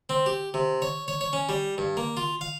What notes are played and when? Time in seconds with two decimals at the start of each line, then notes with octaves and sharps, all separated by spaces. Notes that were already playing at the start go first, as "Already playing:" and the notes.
0.09 C4
0.26 G4
0.54 C3
0.82 C#5
1.08 C#5
1.21 C#5
1.33 C#4
1.49 G3
1.78 G2
1.97 A#3
2.17 F4
2.41 F5